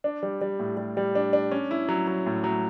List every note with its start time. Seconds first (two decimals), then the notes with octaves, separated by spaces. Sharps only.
0.04 D4
0.23 G3
0.41 G3
0.59 A2
0.77 G3
0.97 G3
1.15 D4
1.33 D4
1.51 C#4
1.71 E4
1.89 F#3
2.07 F#3
2.26 A2
2.44 F#3